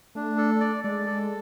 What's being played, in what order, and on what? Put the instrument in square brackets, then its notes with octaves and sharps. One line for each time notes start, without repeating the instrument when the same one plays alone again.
[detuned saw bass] A3 [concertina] D4
[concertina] A4
D5
[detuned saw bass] G#3 [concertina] D5
[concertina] A4